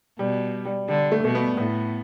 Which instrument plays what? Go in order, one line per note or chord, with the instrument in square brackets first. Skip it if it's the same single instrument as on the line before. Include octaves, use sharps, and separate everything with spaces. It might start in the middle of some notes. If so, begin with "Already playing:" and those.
[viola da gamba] B2 [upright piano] G3
[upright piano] G3
[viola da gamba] D3 [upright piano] G3
[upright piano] A3
[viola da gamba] B2 [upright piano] A3
[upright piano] B3
[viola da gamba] A2 [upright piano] B3